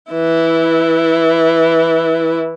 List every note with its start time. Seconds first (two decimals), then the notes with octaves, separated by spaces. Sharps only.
0.11 E3 E4